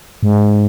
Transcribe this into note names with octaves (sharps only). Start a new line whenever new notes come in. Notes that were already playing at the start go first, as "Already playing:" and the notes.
G#2